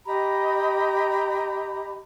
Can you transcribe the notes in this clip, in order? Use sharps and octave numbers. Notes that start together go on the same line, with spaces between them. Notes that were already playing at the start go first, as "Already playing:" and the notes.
G4 D#5 A#5 B5